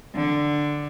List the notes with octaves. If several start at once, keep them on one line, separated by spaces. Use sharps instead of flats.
D3